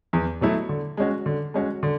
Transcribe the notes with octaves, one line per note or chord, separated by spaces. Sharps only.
E2
B2 F#3 A3 E4
D3
G#3 C#4 F#4
D3
G#3 C#4 F#4
D3